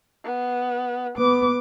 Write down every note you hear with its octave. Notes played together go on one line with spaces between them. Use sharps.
B3
B3 D6